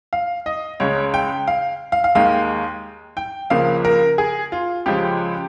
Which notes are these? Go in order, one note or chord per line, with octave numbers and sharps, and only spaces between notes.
F5
D#5
C#2 C#3 G#3 C#5
G5
F5
F5
F5
D#2 D#3 G#3 F5
G5
C#2 C#3 F3 A#3 F5
A#4
G#4
F4
C#2 C#3 F3 G#3 G4